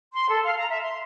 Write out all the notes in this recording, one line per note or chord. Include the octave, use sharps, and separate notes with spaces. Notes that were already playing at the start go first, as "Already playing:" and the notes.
C6
A4
F5
A#5
E5
C6